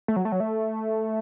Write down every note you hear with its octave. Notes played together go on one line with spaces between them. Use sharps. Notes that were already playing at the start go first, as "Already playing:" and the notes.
A3
F#3
A3
F#3
A3